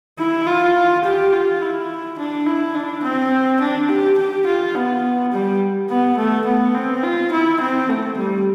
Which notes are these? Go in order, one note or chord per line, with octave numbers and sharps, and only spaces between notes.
E4
F4
G4
F4
E4
D4
E4
D4
C4
D4
G4
G4
F4
B3
G3
B3
A3
B3
C4
F4
E4
C4
A3
G3